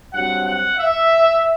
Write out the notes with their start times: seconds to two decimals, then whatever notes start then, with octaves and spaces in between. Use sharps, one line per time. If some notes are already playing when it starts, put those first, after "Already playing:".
0.14 G2 F#3 C4 F#5
0.45 F#5
0.77 E5